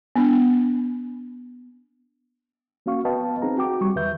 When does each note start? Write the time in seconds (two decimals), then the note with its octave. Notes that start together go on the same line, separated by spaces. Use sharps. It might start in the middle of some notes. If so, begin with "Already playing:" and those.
0.16 B3 D4
2.86 A#3 C#4 F#4 F5 C#6
3.05 B3 B4 D#5 F5 G5 A5
3.42 C4 D#4 G#4 A#5
3.58 F#4 G5 D6
3.81 G3 C#6
3.95 E2 D#3 B4 E5 G6